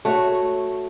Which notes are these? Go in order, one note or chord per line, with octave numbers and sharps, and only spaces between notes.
A3 F#4 C#5